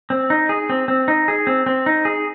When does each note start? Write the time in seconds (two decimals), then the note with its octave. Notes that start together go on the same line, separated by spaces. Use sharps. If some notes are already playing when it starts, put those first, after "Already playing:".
0.10 C4
0.30 D#4
0.49 G#4
0.70 C4
0.88 C4
1.08 D#4
1.28 G#4
1.47 C4
1.66 C4
1.86 D#4
2.05 G#4